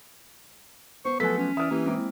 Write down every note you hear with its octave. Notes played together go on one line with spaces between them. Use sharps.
B3 C5 C#6
F3 F#3 A3 B3 A4 G#5 B6
C#4
E3 D5 E5 D#6 F6
E3 A#3 G4
G#3 A#3 C4 E4